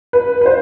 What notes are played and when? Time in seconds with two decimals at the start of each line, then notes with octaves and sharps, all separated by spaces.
0.13 B4
0.41 B4
0.46 C5